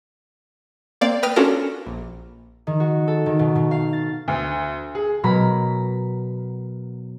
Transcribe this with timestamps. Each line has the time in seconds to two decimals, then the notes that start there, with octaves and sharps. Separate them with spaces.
1.01 A#3 C4 D5 F5
1.23 B4 G5 D#6 F6 A#6
1.36 C#4 D4 F4 F#4 A4 A#4
1.87 A#1
2.67 D#3
2.80 F#4
3.08 A4
3.26 D#3
3.39 B2
3.55 B2
3.71 F5
3.93 A6
4.28 D2
4.95 G#4
5.23 B2 F#3 A#4 A#5 B5